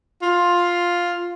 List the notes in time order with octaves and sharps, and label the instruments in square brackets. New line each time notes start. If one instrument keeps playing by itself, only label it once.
[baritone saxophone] F4